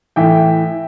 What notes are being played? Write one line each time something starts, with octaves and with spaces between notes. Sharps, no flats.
A2 E3 E5 G5